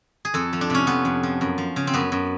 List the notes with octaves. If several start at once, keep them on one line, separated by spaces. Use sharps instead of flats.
G#4
F2 A4
F3
D4
C3 C#4
F2 B3
F2
F3
F#2
F3
C#3
C4
F#2 B3
F#2